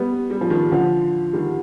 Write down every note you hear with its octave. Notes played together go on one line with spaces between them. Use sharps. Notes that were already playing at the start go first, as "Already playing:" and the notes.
Already playing: G3 B3
G3
F3
D#3 G3
D3 F3
D#3 G3